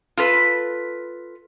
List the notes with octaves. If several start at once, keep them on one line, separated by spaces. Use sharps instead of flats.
F4 A4 B4